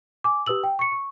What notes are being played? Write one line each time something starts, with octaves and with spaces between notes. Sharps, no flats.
G#5 D6
G4 B4 D#6 E6 F#7
G5
C#6 C#7
C#6